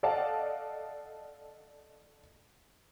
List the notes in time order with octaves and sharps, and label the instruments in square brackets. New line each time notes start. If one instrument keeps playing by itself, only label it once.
[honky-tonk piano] A4 D5 D#5 F5 F#5 A5